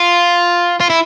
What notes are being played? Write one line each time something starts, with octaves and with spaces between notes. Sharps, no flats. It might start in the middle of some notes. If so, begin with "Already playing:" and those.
Already playing: F4
F4
E4